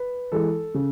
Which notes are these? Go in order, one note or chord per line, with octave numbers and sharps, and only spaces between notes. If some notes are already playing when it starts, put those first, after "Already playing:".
Already playing: B4
E3 G#3 A4
C#3